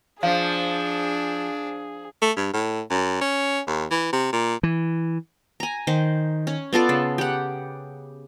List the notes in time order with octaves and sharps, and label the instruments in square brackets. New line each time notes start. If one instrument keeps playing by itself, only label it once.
[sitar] F3 [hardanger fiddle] D4 [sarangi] G#4 [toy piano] F5
[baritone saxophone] A3
G2
A2
F#2
C#4
D#2
E3
C3
A#2
[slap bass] E3
[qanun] G#5 A#5
D#3 C5
C#4
B3 F4 A4 D5
C#3
G4 F#5